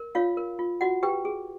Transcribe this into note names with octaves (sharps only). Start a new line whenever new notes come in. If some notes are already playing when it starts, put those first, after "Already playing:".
Already playing: A#4
F4 C#5 F5
A#4
F4
F4 F#4 F#5
G4 B4 G5
G#4